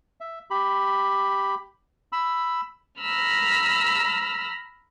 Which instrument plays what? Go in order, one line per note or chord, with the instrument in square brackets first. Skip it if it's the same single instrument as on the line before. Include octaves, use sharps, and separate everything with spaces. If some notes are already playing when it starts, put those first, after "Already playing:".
[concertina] E5
G4 B5
B5 E6
[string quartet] A#5 B5 E6 F6